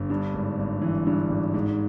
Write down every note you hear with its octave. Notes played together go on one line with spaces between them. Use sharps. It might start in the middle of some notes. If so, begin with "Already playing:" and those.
Already playing: G1
G2
G#1
G#1
E3
G2
G#1
G#2